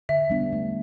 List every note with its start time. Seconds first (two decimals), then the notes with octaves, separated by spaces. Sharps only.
0.09 D3 E5
0.30 G3 B3 D4
0.53 A3